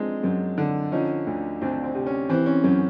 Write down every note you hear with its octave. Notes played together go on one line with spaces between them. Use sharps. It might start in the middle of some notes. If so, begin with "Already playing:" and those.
Already playing: F3 G#3 C4 D4 D#4
F#2
D3
F3 C#4 D#4
D2
D2 C4 D4
C4
C3
C#4
E3 C4
C#4
F#2 C#4